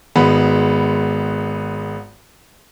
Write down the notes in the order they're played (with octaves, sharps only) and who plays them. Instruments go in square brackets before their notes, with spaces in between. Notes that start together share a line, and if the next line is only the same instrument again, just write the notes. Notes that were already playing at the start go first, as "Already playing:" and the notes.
[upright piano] G#1 G#3 B3 B5